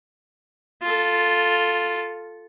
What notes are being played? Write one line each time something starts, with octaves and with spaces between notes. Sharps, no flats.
F4 A4